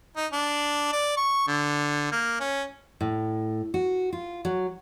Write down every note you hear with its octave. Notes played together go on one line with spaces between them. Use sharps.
D#4
D4
D5
C#6
D3
A#3
C#4
A2
F#4
F4
F#3